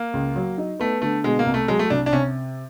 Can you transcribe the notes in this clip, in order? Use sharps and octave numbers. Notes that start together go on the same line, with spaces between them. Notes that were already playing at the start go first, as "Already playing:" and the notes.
Already playing: A#3
C#2
F#3
D#4
A3 B3
D3 A3
B2 G#3
A#3
C2
A3
F#3 G#3
A3
C2 D4
D4
C3 C#4